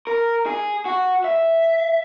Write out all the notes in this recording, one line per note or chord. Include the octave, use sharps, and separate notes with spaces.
A#4
G#4
F#4
E5